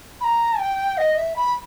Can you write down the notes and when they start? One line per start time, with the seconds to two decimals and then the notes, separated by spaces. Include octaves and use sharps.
0.21 B5
0.24 A#5
0.59 G5
0.97 D#5
1.17 E5
1.36 B5